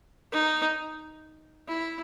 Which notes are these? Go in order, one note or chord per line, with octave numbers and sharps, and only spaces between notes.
D#4
E4